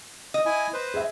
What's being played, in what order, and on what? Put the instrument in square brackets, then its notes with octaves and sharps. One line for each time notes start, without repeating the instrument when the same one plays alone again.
[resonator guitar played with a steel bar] D#5
[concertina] E4 G#5
B4 C5
[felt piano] G#4 E5